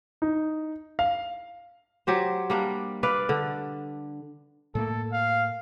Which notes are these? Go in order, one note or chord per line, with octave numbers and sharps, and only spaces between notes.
D#4
F5
F#3 G4 C5
G3 A#3 D4
B4 D5 F5
D3
A2 A3 A#3 A4
F5